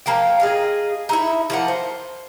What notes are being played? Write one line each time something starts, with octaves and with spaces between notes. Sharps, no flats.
F3 A#3 F5 G5
F4 G#4 D#5
D#4 E4 E5
F3 A#3 F#5
C5